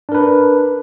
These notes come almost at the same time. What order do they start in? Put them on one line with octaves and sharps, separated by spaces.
D4 A#4 B4